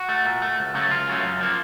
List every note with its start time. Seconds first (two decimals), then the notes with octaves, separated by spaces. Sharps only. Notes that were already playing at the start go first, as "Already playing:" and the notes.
Already playing: F#4
0.09 A3
0.25 A#2
0.42 A3
0.59 C#2
0.74 C#3 F#3 A3
0.91 C#2 F4
1.07 C#3 F#3 A3
1.24 F#2
1.41 F3 A#3